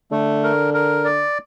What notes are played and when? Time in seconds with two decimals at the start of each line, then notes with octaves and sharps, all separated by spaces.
0.12 D3 A3
0.43 A#4
0.74 A#4
1.05 D5